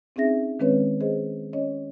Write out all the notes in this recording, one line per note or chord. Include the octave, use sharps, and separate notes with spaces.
C4 C#4 D#4 G#4 E5 A#6
D#3 G#3 C4 C#4 B4 C#5
G#4 C5 D#5
C#4 C#5 D#5